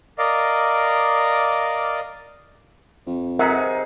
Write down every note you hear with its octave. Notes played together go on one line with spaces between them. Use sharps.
A#4 D5 D#5 F5 D6
F2
C3 D#4 G#4 A#4 E5 F#5